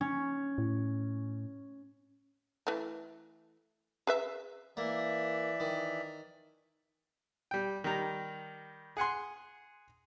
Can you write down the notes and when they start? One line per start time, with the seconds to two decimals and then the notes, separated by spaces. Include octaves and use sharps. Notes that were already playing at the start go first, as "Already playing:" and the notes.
0.01 C#4
0.58 A2
2.67 E3 A3
4.07 G#4 B4 E5
4.77 E3 A#3 D5 E5
5.60 D#3
7.51 G3 G5
7.84 D#3 G3 A#5
8.97 G#4 F#5 G#5 C6